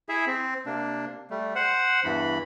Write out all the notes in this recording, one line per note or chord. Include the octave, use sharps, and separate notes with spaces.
E4 G#4 E5
C4
C3 A#3 D4
G3 A3
C5 F#5
E2 G2 E3 B5